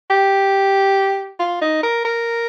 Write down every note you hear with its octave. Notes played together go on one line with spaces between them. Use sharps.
G4
F4
D#4
A#4
A#4